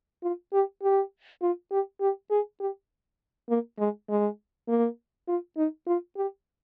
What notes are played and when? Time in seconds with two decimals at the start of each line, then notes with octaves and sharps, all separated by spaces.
0.23 F4
0.53 G4
0.83 G4
1.42 F4
1.72 G4
2.01 G4
2.31 G#4
2.60 G4
3.49 A#3
3.79 G#3
4.09 G#3
4.68 A#3
5.28 F4
5.57 D#4
5.87 F4
6.17 G4